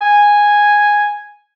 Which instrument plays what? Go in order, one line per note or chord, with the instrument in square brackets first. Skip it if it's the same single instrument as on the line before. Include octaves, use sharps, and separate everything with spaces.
[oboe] G#5